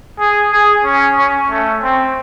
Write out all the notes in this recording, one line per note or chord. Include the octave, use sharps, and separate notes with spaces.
G#4
G#4
C#4
C#4
A3
C4